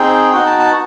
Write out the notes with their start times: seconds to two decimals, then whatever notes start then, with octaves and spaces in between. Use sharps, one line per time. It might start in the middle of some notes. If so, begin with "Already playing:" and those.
Already playing: C4 D#4 G#4 G5
0.32 B3 D#4 F#4 G5
0.46 A5
0.59 A5